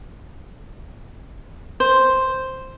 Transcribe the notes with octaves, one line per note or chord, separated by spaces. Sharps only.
C5